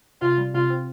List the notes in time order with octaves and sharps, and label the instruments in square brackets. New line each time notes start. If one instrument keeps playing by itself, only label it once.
[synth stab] C3 [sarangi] F4
[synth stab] G3
[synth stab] C3 [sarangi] F4
[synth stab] C4